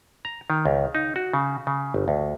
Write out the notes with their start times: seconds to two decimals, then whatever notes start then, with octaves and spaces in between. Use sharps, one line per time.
0.25 A#5
0.50 D#3
0.65 C#2
0.95 D#4
1.16 F#4
1.33 C#3
1.67 C#3
1.94 G1
2.08 D2